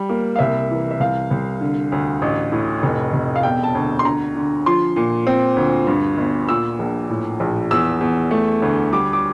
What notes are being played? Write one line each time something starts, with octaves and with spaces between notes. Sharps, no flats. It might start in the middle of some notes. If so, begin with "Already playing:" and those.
Already playing: G3
A#3
F5
C2 E5
E3
E5
C2 F5
C2
D3
D2
A1
A2
F1
F1
F5
E1 G5
A5
D2
C6
D3 A#5
D3
F3 C6
A#2
C4
D2
G2
G1
A#2 E6
A#1
A2
A#1
E2 E6
E2
A3
D2
G3 D6
D6